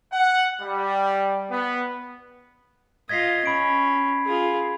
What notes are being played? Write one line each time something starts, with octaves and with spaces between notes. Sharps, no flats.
F#5
G3
B3
F4 D#5 G#6 B6 C7
C#4 B5 D7
F4 G#4